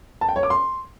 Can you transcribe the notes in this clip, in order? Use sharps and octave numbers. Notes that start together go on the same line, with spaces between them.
A5
G5
C#5
D6
C6